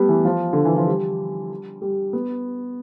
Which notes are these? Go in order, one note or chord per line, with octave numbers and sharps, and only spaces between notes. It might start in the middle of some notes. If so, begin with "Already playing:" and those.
Already playing: G3 A3 B3
E3
F3
D3
E3
F3
G3
G3
B3